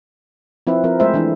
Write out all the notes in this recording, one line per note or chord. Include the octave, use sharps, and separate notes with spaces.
F3 C4 E4 B4 E5
F3 C4 A#4
G#3 A3 G#4 C5 E5
E3 D4 E4